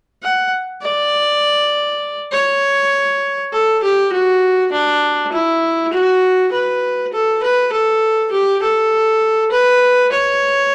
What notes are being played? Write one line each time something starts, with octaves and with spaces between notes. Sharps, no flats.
F#5
D5
C#5
A4
G4
F#4
D4
E4
F#4
B4
A4
B4
A4
G4
A4
B4
C#5